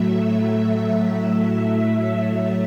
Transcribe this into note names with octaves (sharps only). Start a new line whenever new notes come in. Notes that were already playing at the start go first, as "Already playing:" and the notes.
Already playing: A2 F#3 A3 E5
E5